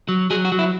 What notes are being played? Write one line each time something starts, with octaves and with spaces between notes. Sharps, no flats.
F#3
F#3 G#4
F#4
F#3
E4